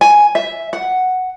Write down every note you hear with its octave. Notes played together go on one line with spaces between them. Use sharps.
G#5
E5
F#5